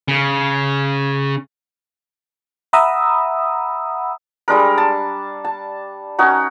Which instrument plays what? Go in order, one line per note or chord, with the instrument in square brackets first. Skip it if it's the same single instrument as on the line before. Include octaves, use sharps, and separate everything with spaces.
[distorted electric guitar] C#3
[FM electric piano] E5 F#5 A#5 B5 D#6 E6
[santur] G3 G#3 D4 A#4
A5
A5
C#4 D#4 F#4 A#4